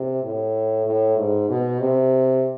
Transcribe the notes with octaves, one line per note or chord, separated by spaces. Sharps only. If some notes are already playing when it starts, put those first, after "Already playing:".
Already playing: C3
A2
A2
G#2
B2
C3